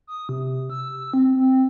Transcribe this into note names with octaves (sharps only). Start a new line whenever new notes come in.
D#6
C3
E6
C4
C4